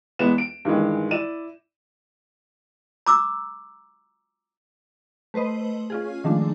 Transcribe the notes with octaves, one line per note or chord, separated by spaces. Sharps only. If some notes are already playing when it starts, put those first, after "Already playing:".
E2 G#3 B3 E7
D7
G2 D#3 E3 G#3
E4 D5 D#7 E7
A#5 D6 E6
A3 B4 C5 D#5
C#4 F4 G#4
D#3 F3 G#3 A3 D4